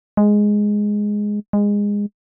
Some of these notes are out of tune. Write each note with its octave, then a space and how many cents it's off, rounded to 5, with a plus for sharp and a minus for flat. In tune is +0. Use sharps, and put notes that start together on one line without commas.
G#3 +0
G#3 -20